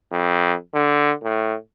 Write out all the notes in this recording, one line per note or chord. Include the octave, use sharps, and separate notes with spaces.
F2
D3
A2